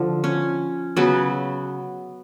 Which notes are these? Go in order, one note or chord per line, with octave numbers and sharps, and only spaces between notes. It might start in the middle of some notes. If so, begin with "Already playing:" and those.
Already playing: D3 F3
C#4
C#3 F#3 B3